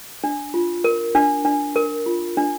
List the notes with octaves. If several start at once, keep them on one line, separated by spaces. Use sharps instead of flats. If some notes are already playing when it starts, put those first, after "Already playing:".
D4
F4
A#4
D4
D4
A#4
F4
D4